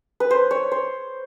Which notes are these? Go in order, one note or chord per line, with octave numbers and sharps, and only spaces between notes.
B4
C5
C#5
C5